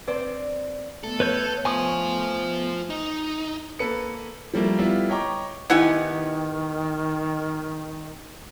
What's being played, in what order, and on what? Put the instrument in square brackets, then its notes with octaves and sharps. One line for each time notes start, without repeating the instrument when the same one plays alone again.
[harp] C4 C5 D5 [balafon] B4
[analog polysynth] A3 B3 [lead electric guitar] A4
[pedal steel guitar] B4 C#5 G6
[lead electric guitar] F4 C5 [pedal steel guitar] G#5 C#6 D#6
[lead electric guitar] D#4
[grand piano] A#3 A4 B4 C#7
F3 G3 A3 A#3
G3 B3 E4 F4
C#5 D#5 G5 A#5 C#6 D6
[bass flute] D#3 [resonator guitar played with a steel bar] B3 D#4 G4 [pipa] E4 F#5 G#5